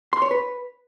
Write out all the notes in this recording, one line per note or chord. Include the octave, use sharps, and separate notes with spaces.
C6
C#5
B4